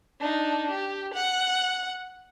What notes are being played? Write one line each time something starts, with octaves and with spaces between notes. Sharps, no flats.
D4 D#4
G4
F#5